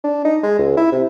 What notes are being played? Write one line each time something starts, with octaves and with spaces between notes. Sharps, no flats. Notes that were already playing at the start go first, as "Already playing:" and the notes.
D4
D#4
G#3
C#2
E4
C3